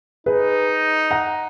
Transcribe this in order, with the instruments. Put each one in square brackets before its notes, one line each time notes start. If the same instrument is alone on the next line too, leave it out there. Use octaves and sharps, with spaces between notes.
[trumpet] D#4 [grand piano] G#4 B4
[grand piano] F#5 A#5